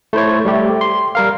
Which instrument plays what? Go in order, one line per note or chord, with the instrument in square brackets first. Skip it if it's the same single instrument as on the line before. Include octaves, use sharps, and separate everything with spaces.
[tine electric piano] A3 E4 C5 C#5
G3 A3 G4
C6
G3 A#4 F5